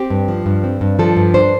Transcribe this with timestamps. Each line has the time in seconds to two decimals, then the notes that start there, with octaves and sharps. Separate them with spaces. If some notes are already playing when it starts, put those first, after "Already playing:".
Already playing: C4 G4
0.10 G2
0.28 F3
0.46 G2
0.64 C4
0.81 G2
0.99 F3 A4
1.16 G2
1.34 D4 C5